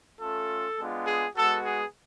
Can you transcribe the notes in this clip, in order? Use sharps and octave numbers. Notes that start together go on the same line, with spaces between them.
A3 C#4 F4 A4
G#3 B3 D4 F4
G#4
G#3 B3 F#4 A4
G#4